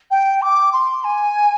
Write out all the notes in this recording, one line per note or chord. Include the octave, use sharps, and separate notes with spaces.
G5
D6
C6
G#5